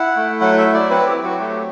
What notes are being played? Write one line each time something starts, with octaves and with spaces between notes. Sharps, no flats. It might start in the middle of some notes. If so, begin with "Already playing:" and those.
Already playing: E4 F#5
A3
F#3 F#5
E5
E4
D5
C4 B4
G4
F#3
F#4
A3 G4